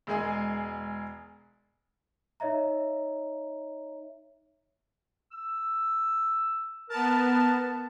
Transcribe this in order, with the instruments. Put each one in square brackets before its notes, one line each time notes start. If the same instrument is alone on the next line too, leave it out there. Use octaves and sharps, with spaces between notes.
[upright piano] E1 G#3 G#4 G#5
[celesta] D#4 C#5 D#5 E5 A#5
[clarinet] E6
[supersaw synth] B3 A5 [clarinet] A#4